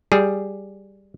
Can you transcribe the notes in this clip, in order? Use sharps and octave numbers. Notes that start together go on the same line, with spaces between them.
G3 G#4